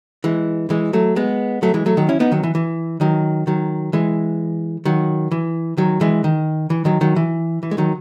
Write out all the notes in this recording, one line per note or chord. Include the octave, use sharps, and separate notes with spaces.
E3 G#3
E3 G#3
F#3 A3
G#3 B3
F#3 A3
E3 G#3
F#3 A3
D#3 F#3
C#4 E4
B3 D#4
D#3 F#3
E3
E3
D#3 F#3
D#3 F#3
E3 G#3
D#3 F#3
E3
D#3 F#3
E3 G#3
D#3
E3
D#3 F#3
D#3 F#3
E3
E3
G#3
D#3 F#3